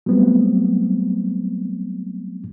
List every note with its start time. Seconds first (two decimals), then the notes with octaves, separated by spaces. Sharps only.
0.06 F#3 G3 A3 B3 C4